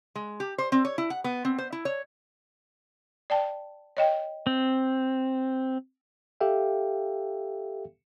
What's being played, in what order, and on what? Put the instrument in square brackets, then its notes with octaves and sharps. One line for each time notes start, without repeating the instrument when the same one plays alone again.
[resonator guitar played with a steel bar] G#3
G4
C5
C4
C#5
E4
F#5
B3
C4
C5
E4
C#5
[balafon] D5 G5 A5
C#5 D#5 G5
[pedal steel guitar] C4
[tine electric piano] G4 A4 E5 F5 G5